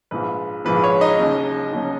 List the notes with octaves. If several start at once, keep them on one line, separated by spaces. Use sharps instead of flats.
A#1 G#2 F3 B4
A#1 G#2 F3 B4
C#5
D#4 D#5
D#2 C#3 F#3
D#2 C#3 F#3